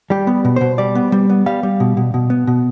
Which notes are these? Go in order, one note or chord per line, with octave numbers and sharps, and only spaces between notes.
G3 G4
B3
B2
B2 C5
G3 D5
B3
G3
B3
G3 F5
G3
B2
B2
B2
B3
B2